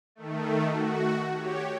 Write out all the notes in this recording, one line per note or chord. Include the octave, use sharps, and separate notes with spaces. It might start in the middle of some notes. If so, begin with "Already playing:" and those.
D#3 A3
F#4
G4 C#5